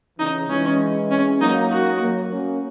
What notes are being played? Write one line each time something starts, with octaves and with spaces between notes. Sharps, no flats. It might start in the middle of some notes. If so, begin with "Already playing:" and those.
C#3 E3 D#4
E3 G#3 C#4
C#4
F#3 A#3 D#4
F#4
F#3 A#3
A#3 C#4